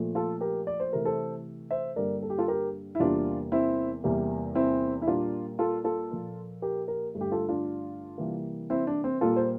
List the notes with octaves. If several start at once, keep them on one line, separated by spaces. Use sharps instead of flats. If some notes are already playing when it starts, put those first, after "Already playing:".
Already playing: A#2 F3 A3
F4 A4
G4 A#4
D5
C5
C3 E3 A3 A#4
A4 C5
C5 E5
G2 D3 G3 A#3 A#4 D5
A4
G4
F4 A4
G4 A#4
E4
E2 C3 G3 A#3 D4 F4
C4 E4
E2 C3 G3 A#3
C4 E4
E4
A#2 G3 A#3 D4 F4
F4 A4
F4 A4
A#2 F3 A#3
G4 A#4
G4 A#4
G2 D3 A3
G4
F4 A4
D4 F4
C3 E3 G3 A#3
C4 E4
D4
C4
A#2 G3 A#3 F4 A4
C5